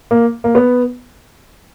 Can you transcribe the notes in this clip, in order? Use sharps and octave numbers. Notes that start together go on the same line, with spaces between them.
A#3
A#3
B3